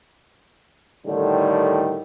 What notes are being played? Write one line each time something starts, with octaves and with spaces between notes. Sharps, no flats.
A2 D3 D#3 G3